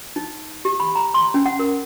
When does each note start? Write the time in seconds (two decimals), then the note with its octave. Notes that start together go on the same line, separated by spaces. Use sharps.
0.16 D#4
0.65 G4
0.80 B5
0.95 A#5
1.14 C6
1.34 C#4
1.46 F#5
1.59 A#4